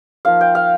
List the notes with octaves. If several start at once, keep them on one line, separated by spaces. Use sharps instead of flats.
F3 A#3 D#4 F5
G5
F5